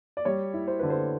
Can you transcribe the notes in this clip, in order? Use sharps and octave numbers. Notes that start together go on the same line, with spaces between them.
D5
G3 C#5
E4
C5
D3 B4
C5